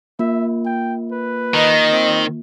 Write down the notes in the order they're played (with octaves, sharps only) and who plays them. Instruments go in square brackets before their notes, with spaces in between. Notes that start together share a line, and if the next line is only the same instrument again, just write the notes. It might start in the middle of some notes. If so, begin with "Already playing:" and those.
[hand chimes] A#3 F4 [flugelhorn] E5
[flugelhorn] G5
B4
[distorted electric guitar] D#3 [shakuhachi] D#5
[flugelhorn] C4